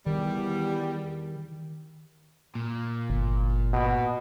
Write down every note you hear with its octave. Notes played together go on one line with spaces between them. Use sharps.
E2 D#3 G3
A#2
G1
B2